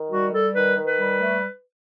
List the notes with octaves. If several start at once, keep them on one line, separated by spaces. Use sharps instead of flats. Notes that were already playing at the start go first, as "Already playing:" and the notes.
Already playing: D#3
G3 F#4
G3 A4
D#3 B4
D#3
B4
G3
A3